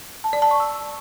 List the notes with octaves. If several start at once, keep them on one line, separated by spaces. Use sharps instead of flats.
A5
D5
A5
C#6
E6